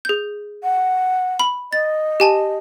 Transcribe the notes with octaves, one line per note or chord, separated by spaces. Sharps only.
G#4 G6
F#5
B5
D#5 A6
G4 G#5 A5